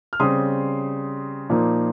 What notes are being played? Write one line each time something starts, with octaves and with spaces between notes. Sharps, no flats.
F6
C#3 G3 C4 C6 D#6
A#2 F3 A#3 D#4